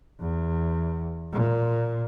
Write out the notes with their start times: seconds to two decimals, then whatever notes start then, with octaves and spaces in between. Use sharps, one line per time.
0.20 E2
1.33 A#2